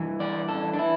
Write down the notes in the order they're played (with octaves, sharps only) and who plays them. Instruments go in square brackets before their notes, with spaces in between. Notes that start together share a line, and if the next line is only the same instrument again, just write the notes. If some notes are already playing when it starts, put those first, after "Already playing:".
Already playing: [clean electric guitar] G2 E3
D5
A4
D4
E3 E4